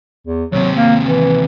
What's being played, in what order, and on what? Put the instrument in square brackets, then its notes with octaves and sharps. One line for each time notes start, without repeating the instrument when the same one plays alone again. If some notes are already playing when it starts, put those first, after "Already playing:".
[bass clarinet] E2
[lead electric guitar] D#2 C3 [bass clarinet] F#3
[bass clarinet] A#3
E3